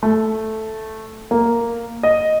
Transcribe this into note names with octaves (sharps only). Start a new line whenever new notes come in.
A3
A#3
D#5